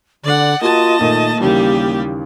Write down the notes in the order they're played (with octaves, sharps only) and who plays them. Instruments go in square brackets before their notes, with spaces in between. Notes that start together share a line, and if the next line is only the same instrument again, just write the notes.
[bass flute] D3 [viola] D5 F#5
[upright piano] A#3 F#4 [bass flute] F4 [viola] D#5 A5
[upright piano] A#2 D#3 A3 [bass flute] A#3
[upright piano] D#2 C#3 E3 [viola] G3 G4